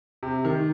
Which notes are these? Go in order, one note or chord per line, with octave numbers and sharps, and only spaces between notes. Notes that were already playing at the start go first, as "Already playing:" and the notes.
C3
D#3